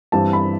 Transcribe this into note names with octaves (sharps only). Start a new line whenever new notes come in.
G2 E3 G3 C4 A5
B5